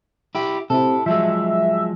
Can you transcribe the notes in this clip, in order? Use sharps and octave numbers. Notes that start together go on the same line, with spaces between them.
E4 G4
C3 E4 A4
F3 F#3 G#3 E5